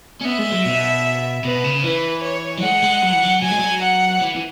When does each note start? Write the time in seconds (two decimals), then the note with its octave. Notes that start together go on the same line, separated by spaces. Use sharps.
0.21 C#4
0.25 B3 E5
0.38 G#3
0.52 F#3
0.65 B2
1.44 B2 B4
1.64 C#3
1.84 E3 B4
2.24 C#5
2.57 F#3
2.63 G#3 F#5
2.83 G#3
3.02 F#3
3.13 E3
3.23 F#3
3.42 F#3 G#5
3.51 G#3
3.59 F#3
3.82 F#5
4.21 E3
4.35 E3